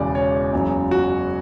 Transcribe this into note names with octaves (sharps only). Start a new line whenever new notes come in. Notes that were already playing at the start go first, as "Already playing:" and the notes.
Already playing: E1 E2 C#3 D5
C#5
F#1 E2 C#3 F#3
F#4